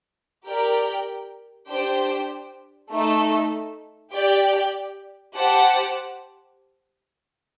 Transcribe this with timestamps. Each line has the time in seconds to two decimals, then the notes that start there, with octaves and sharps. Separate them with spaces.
0.47 G4 A#4 D5 G5
1.69 D4 G4 C5 G5
2.91 A3 D#4 A4
4.13 G4 D5 G5
5.35 G4 C5 F#5 A5